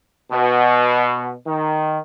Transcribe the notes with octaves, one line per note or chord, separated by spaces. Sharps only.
B2
D#3